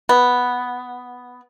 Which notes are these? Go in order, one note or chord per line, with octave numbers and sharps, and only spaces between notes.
B3